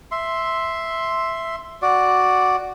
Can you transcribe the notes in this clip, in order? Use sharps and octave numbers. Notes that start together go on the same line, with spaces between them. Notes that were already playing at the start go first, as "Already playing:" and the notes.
E5 C6
F#4 D5